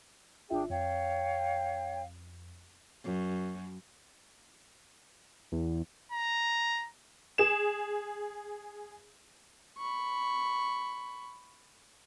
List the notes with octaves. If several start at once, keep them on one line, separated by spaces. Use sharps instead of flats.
G#1 D4 F4 G#4 E5 G5
F2 C#5 F5 G5
F#2
E2
A#5
G#4 E7
B5 C#6